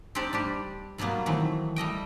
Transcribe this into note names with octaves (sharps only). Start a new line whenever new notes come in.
C4 D4 D#4 G4 C5 D5
G3 D4 G4
B2 F#3 G3 A#3 B3
D#3 E3 F#3 A3 C4
G3 A3 D#5 G5